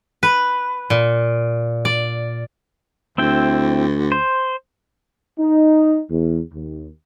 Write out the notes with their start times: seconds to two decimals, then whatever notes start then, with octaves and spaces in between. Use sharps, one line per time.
0.23 B4
0.90 A#2
1.85 D5
3.18 D2 C4 E4 G5
4.12 C5
5.39 D#4
6.09 E2
6.53 D#2